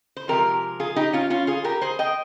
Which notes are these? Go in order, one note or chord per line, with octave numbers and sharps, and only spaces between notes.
C5
C3 F3 G#3 G4 A#4
F4 G#4
D#4 G4
C#4 F4
C#4 F4
F4 G#4
G4 A#4
G#4 C5
D#5 G5